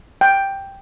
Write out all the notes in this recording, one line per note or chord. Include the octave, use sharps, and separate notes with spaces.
G5